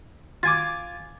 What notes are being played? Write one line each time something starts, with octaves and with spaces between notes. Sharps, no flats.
F4 G#5 D6